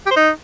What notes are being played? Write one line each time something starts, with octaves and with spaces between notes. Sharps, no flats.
G4
C5
D#4